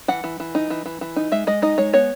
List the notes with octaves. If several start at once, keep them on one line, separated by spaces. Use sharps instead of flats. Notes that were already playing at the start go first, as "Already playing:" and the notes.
E3 F#5
E3
E3
D#4
E3
E3
E3
D#4
G#3 E5
G#3 D#5
D#4 D#5
G#3 C#5
B3 C#5